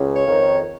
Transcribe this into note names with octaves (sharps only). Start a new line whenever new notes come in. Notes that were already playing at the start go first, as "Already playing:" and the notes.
Already playing: C#2 C#3
C#5
F2 D#3